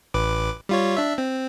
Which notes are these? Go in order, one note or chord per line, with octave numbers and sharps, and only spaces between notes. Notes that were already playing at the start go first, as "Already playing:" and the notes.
A1 B4 D6
G3 F4 C#5
D4 E5
C4